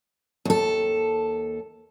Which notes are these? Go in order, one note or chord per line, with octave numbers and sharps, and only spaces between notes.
D#2 A4